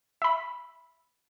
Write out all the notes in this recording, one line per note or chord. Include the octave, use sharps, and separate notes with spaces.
E5 B5